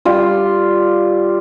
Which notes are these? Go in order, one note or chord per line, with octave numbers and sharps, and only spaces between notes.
G3 F4